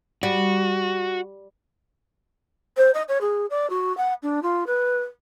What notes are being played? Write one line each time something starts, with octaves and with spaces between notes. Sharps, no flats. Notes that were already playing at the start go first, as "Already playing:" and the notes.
G3 F#4
C5
D#5
C#5
G#4
D5
F#4
F#5
D4
F4
B4